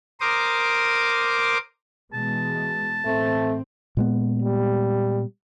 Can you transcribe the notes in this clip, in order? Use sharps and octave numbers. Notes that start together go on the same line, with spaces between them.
A#4 C5 D6 D#6
B2 E3 G#3 A5
A1 A3 C4
A#2 G#3 B3
G3